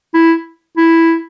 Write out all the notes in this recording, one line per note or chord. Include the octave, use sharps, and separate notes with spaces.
E4
E4